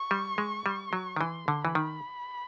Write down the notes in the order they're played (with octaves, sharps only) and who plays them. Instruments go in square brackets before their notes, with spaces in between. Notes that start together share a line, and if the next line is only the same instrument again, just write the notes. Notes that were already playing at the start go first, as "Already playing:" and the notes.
Already playing: [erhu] C#6
[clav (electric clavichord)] G3
G#3
G3
F#3
D#3
[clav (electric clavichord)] E3 [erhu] C6
[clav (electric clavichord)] D3
[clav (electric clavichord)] E3 [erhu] B5
[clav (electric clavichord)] D#3